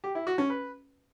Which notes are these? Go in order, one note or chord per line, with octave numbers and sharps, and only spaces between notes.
G4
E4
F#4
C#4
B4